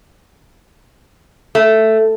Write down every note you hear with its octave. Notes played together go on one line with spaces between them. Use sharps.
A3